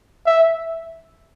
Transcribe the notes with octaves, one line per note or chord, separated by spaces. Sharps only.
E5